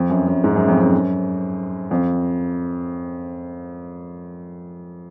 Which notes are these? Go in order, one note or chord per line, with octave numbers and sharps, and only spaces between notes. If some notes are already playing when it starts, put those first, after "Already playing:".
Already playing: F2
F#2
F#2
G#2
F#2
F2
F#2
F2